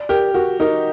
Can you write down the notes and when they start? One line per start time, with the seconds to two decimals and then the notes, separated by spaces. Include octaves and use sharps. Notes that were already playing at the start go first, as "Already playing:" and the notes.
Already playing: D5
0.09 G4 A#4
0.34 F#4 A#4
0.60 D#4 A#4